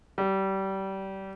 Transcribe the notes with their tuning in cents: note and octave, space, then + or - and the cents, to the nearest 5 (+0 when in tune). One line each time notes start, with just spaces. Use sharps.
G3 -25